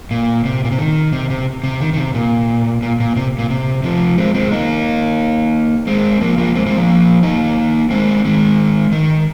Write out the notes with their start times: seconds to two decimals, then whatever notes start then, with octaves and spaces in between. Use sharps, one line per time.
0.11 A#2
0.45 C3
0.64 A#2
0.72 C3
0.79 D#3
1.13 C3
1.30 C3
1.64 C3
1.81 D#3
1.93 D#3
1.97 C3
2.14 A#2
2.82 A#2
3.00 A#2
3.16 C3
3.39 A#2
3.50 C3
3.83 C3 F3
4.18 G#3 C4
4.34 G#3 C4
4.52 A#3 D#4
5.87 G#3 C4
6.21 F3 A#3
6.38 F3 A#3
6.55 G#3 C4
6.66 G#3 C4
6.77 F3 A#3
7.23 A#3 D#4
7.91 G#3 C4
8.24 D#3 G#3
8.92 D#3